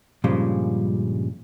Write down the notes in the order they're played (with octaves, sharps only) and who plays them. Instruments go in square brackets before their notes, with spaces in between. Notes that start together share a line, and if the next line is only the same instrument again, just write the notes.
[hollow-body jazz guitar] G2 A#2 C#3 F3 G3 G#3